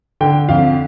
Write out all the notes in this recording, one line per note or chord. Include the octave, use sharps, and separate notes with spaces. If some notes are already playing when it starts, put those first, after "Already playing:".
D3 G5
F2 F5